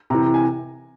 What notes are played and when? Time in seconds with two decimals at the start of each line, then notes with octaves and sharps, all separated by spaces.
0.10 C3 E3 A#5
0.34 G#5